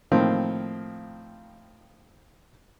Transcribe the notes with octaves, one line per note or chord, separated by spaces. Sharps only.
A2 D#3 F3 A#3 C4